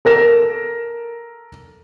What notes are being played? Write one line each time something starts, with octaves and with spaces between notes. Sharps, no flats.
A4 A#4 A#6 E7